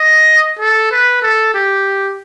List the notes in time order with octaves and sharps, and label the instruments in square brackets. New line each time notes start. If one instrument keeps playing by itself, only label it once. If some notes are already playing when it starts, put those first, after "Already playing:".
Already playing: [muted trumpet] D#5
A4
B4
A4
G4